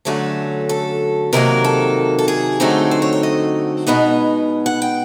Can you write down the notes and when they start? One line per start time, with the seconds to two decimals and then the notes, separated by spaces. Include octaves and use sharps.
0.05 D3 F#3 A3 C#4 A4
0.69 A4
1.33 C3 D#3 F#3 A#3 A#4
1.64 A4
2.19 A4
2.28 G#4
2.60 D3 F#3 A3 C4 D#4
2.91 C5
3.02 C#5
3.13 C#5
3.23 D#5
3.87 B2 G#3 B3 D#4
4.66 F#5
4.82 G5